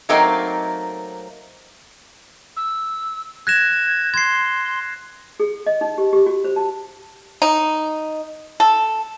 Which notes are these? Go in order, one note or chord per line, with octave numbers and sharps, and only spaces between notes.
F#3 A3 A#3 C4 D#4
E6
F#6 G#6 A#6 E7
C6 G#6 C7
G#4
D#5
D#4
G4
G4
F#4
C5
A5
D#4
A4